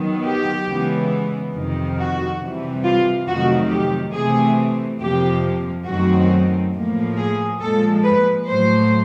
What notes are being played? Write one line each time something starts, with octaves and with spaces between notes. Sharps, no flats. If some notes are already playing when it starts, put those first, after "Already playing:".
Already playing: D#3 F#3 B3
G4
C#3 E3 G#3 B3
F2 C3 D#3
F#4
C3 E3 G3
F4
F2 C3 D#3 F#3 A3 F#4
G4
C3 E3 A3 C4 G#4
F2 C3 F3 A#3 G4
F#2 D#3 F#3 A3 C4 F#4
A2 F3 A#3
G#4
A#2 F3 G#3 A4
B4
A2 F#3 A3 C5